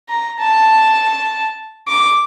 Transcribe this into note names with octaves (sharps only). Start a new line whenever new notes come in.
A#5
A5
D6